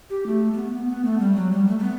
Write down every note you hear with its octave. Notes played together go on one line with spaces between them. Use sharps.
G4
A3
A3
B3
B3
B3
A3
G3
F#3
G3
A3
A3
B3